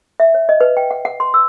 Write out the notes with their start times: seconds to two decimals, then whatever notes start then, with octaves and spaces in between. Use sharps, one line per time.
0.20 E5
0.34 C#5
0.49 D#5
0.61 B4
0.77 G5
0.91 F#5
1.05 F#5
1.20 C6
1.34 E6